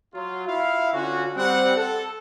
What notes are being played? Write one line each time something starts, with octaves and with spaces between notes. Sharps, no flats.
F#3 F4
E4 F4 E5 F5
D3 C#4 F4 F#4
G3 C4 F#5
A4